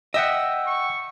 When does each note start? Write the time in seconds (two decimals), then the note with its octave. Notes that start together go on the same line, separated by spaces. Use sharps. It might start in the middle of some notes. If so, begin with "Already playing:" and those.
0.14 D#5 E5 F#5 G5 E6
0.67 C#6